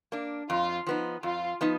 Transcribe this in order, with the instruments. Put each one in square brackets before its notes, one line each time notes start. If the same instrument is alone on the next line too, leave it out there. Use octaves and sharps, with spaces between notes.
[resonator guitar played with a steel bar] A#3 D4
[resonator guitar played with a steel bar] F2 [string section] F4
[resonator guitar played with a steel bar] F3 B3 D#4
[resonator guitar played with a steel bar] F2 [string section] F4
[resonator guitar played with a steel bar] F3 B3 D#4